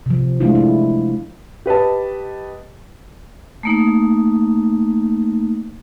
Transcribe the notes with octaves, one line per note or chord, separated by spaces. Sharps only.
C3 F3
G#3 A3 D4 E4 F4
E4
G4 B4 D#5 A5
A3 A#3 D#4